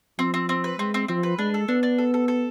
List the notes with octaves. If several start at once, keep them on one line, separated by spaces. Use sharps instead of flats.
F3 C4
C4
C4
B4
G#3 C4
C4
F3 C4
B4
G#3 D4
A4
B3 D4
D4
A4
A4
A4